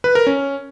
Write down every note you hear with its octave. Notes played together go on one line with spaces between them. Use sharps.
B4
A#4
C#4